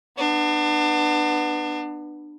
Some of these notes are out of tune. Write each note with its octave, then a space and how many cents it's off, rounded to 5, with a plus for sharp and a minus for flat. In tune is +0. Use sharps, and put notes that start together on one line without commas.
B3 +0 D4 +30